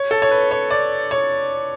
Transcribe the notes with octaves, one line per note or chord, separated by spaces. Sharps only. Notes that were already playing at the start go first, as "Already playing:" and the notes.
Already playing: C#5
A4
C#5
B4
C#5
D5
C#5